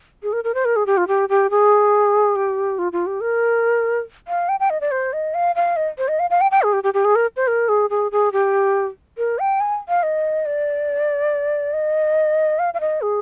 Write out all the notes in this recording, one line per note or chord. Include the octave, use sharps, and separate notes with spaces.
G#4
A#4
A#4
C5
A#4
G#4
G4
F4
G4
G4
G#4
G4
F4
F4
G4
A#4
F5
G5
G5
D#5
D5
C5
D#5
F5
F5
D#5
C5
D#5
F5
F5
G5
G5
G#4
G4
G4
G4
G#4
A#4
C5
A#4
G#4
G#4
G#4
G4
A#4
G5
G#5
F5
D#5
D5
D#5
F5
F5
D#5
G#4